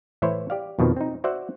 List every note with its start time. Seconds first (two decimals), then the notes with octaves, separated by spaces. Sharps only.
0.22 A2 E3 E4 C5 C#5
0.50 G4 D5 F5
0.79 F2 B2 D#3 F3
0.96 C4 D#4
1.24 F#4 C5 D5 E5 F#5